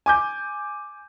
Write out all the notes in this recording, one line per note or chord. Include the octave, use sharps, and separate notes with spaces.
G#5 D6 G6